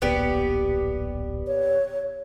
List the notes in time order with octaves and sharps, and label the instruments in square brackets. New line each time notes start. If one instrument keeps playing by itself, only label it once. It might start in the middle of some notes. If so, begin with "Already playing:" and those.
[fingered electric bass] D1 A#1 [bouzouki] B3 G4 D5
[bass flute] C#5